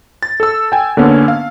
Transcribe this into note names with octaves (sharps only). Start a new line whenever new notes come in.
A6
A4 E6
G5 G#5
D3 A#3 B3 C#4
F5